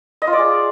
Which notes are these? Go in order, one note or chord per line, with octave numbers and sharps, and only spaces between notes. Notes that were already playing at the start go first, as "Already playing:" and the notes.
D#5
F4
D5
G#4